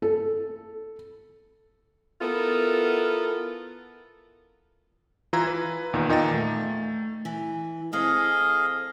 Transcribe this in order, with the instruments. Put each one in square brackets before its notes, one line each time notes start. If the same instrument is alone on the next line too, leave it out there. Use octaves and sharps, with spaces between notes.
[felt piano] A4
[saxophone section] B3 E4 F4 A4 A#4
[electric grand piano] E3 F4 A#5 E6 G#6
B4
E2 A#2 D#3
E2 A#2 D#4 D#5 G5 A6
A3
[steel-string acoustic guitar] E3
[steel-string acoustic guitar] C4 A4 [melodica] G#4 D#5 F5